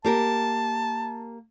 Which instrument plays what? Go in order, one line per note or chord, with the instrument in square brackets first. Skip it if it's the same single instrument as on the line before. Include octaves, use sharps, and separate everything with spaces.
[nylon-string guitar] A#3 G4 A#4 [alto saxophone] A5